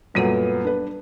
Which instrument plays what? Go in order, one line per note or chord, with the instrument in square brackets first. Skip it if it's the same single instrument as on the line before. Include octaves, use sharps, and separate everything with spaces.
[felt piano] F#2 A#2 D#7 [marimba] G3 A4 F#5 [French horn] B3
[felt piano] D4 B4